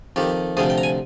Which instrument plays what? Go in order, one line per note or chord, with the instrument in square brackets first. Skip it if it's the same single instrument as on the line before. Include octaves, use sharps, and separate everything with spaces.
[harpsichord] F2 D#3 G4
D2 C3 F3 G#4
G5
A#5
G#5